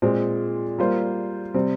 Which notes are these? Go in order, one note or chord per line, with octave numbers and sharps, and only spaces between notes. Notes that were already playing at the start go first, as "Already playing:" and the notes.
A#2 G#3 C4
G3 A#3 F4 C5
C3 G3 C4